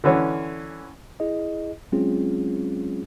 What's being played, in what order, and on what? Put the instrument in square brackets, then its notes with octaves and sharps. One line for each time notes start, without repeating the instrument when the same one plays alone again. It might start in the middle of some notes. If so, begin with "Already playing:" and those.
[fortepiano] D3 E3 C#4
[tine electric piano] E4 G#4 D#5
F#3 G#3 C4 C#4 F4 G#4